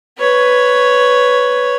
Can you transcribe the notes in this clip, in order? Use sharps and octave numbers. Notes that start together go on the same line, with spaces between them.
B4 C#5